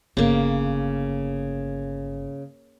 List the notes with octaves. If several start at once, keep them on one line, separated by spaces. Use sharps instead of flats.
G1 C#3 A#3